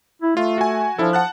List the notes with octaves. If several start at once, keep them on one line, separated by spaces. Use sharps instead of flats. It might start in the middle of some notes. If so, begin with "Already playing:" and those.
E4
A3 F4
F#4 G#5
F3 D4 E4 A4
F#5 A5 F#6